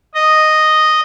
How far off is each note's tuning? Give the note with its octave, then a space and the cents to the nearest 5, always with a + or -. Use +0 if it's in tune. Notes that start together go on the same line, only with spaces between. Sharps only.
D#5 -5